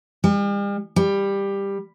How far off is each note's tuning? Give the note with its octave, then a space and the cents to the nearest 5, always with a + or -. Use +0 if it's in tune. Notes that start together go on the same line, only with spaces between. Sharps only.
G3 +45
G3 +15